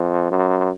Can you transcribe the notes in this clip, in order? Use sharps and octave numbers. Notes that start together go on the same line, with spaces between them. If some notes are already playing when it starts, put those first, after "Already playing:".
Already playing: F2
F#2